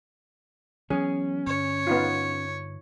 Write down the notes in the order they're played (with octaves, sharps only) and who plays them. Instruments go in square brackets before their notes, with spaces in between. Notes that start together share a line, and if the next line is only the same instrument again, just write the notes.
[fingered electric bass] E3 F#3 B3 [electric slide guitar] C#4 [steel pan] G#4
[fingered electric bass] G2 D3 [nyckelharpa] C#5
[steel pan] B3 D#4 F4